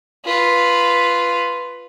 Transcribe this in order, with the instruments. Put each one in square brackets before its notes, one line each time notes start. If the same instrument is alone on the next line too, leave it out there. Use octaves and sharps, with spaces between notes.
[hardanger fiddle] F4 B4